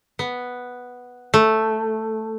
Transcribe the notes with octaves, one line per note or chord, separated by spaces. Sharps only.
B3
A3